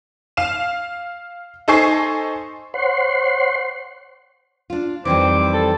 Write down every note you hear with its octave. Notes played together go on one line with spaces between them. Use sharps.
F5 E7
D#4 A4 C5 G#5 C#6 C7
C5 C#5 F#5 C6
D4 F4
F2 D#3 E3 G3 C4 C5 D6
A4